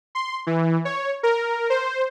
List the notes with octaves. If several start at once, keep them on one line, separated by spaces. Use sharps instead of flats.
C6
E3
C#5
A#4
C5